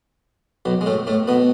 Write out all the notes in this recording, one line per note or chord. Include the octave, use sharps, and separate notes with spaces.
B1 B2
G#3
A2 A3
A2 A3
B2 B3